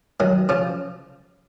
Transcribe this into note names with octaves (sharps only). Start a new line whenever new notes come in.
D#3 F#3
C#3 F3